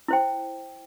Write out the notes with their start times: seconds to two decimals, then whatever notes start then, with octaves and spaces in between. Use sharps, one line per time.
0.08 E4 C5 G5